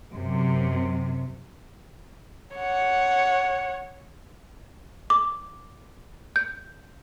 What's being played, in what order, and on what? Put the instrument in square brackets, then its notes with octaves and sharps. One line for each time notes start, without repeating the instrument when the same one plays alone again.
[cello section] F#2 C3
[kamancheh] C#5 F#5
[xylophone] D6
G6